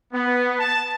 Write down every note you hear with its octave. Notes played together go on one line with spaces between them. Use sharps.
B3
A5